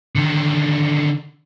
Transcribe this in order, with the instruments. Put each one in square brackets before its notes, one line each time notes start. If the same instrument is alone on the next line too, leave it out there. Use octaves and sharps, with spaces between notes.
[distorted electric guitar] D3 D#3